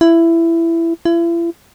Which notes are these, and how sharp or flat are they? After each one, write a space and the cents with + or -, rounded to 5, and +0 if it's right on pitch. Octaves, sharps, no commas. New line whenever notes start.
E4 +15
E4 +40